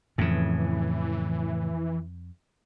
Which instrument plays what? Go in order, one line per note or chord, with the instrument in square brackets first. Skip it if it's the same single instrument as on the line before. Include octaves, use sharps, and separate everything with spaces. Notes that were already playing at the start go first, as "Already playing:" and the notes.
[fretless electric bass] F2 [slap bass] A2 C#3 [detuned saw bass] E3